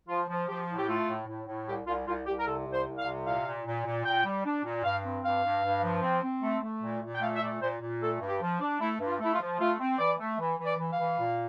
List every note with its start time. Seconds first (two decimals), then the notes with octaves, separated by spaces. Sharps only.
0.08 F3 F4
0.28 F3
0.48 F3 G4
0.68 A2
0.77 G4
0.87 A3 F4
1.07 A2
1.27 A2
1.47 A2
1.67 C2 G4
1.86 C2 F4
2.06 C2 F4
2.26 C2 G4
2.38 A#4
2.46 C3 A4
2.66 C2
2.72 C5
2.86 C2
2.98 F5
3.06 C3
3.25 A#2 F5
3.45 A#2
3.64 A#2
3.85 A#2
4.05 A#2 G5
4.24 G3
4.44 D4
4.63 A#2
4.83 G2 F5
5.04 C4
5.23 G2 F5
5.43 G2
5.63 G2
5.82 F3
6.03 C4
6.22 C4
6.42 A3
6.62 A3
6.82 A#2
7.02 A#2
7.14 G5
7.21 A3 F5
7.35 E5
7.41 A#2 D5
7.61 A#2 C5
7.81 A#2
8.01 A3 A4
8.21 G2
8.27 G4
8.41 F3
8.59 D4
8.80 A3 E4
8.99 G2
9.06 F4
9.19 A3 E4
9.33 F4
9.39 F3
9.59 A3 F4
9.79 C4
9.98 E3 D5
10.18 A3
10.39 E3
10.58 E3
10.65 D5
10.78 E3
10.91 F5
10.98 E3
11.18 A#2